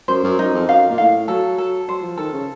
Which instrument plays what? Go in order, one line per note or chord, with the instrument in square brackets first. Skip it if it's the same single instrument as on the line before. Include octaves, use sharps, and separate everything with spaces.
[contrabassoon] F#2 [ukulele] C5
[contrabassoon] F#2
[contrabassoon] F#2 [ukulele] D#4
[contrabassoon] F2
[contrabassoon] F#2 [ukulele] F5
[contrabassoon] A#2
[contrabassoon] A2 [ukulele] F5
[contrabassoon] F#3 [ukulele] A4
[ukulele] A4
[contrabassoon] F#3 [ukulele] C5
[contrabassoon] F3
[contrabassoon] D#3 [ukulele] A4
[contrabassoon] C#3